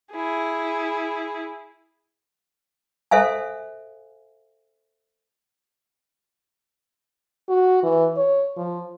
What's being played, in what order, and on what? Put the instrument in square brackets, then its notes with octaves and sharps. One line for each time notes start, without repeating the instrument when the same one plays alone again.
[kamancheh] E4 G#4
[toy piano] A4 C5 E5 F5 G#5
[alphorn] F#4
E3
C#5
F3